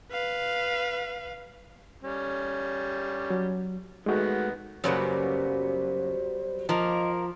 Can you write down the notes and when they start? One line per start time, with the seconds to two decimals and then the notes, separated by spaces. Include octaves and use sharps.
0.11 B4 F5
2.03 G3 C#4
3.30 F#3
4.06 D#3 G#3 A3 B3 F#4
4.84 F#2 C#3 F#3 G3 A#3 B3 C5
6.69 F3 A#3 A#4 D#5